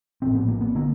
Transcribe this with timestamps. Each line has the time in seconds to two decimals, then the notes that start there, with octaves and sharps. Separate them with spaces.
0.22 A#1 A2 C4
0.35 B3
0.48 A#3
0.61 B3
0.75 D3 A#3